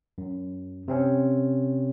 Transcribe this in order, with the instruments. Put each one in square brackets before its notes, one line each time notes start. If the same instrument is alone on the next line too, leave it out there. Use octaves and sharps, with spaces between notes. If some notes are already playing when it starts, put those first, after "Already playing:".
[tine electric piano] F#2
C3 C4 C#4